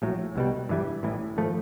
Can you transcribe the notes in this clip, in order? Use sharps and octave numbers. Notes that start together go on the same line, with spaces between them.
A#1 A2 F#3
C2 B2 G3
G2 E3 G3
A1 A2 E3
G#1 F3 A3